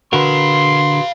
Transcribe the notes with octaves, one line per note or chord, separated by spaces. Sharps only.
D3 F#4 A#4 B4 F5 B5 C6